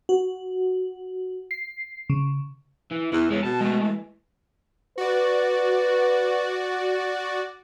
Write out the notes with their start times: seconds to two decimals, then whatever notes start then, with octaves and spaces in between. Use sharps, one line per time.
0.09 F#4
1.51 C7
2.10 C#3
2.92 E3
3.13 E2 E3
3.31 E2 G#3 C#4
3.44 B2 A5
3.61 G#3 A3
3.81 E3
4.98 F#4 B4 D5